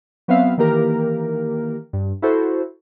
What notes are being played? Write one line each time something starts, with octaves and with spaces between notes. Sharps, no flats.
F#3 B3 C4 E5 F5
D#3 E3 A#3 G4 A#4
G2
E4 F#4 A4 C5